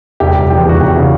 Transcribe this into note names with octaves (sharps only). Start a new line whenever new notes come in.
E1 G4
E1
E2 G4
E1 F#4
E1 G4
C#3